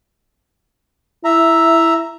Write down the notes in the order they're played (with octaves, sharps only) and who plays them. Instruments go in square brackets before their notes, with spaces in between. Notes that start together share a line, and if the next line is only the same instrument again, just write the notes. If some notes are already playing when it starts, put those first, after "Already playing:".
[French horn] E4 [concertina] E5 A#5